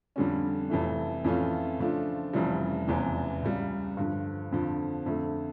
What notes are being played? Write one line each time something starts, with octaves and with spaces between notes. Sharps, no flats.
F2 D3 G3 C#4
F1 F2 E3 A3
F2 E3 A3 C#4 F4
C#3 F3 A3 D4 F4
F1 F2 C#3 E3 G3
F1 E2 C#3 E3
C#2 C#3 G3
G2 D3 F3
F2 D3 F3
F2 D3 A3